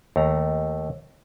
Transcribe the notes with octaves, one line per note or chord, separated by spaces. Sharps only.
D#2 A3 A#5